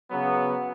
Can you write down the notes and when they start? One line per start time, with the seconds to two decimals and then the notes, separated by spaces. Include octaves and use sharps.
0.11 C#3 F#3 B3